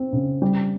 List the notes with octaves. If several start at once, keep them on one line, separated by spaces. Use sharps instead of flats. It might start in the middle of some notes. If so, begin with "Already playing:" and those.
Already playing: C4
C#3
G3